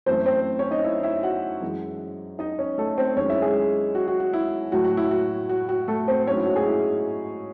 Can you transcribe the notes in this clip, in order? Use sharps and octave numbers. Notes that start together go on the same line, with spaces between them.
F#2 E3 A3 C4 C5
C4 C5
C#4 C#5
D#4 D#5
E4 E5
E4 E5
F#4 F#5
F#2 E3 G#3
D#4 D#5
C#4 C#5
A3 A4
C4 C5
F#2 D#3 G#3 C#4 C#5
E4 E5
G#3 G#4
F#4
F#4
F#4
E4
A2 F#3 A3 F#4
F#4
E4
F#4
F#4
F#4
A3 A4
C4 C5
G#2 F#3 A3 C#4 C#5
E4
F#4
G#3 G#4
E4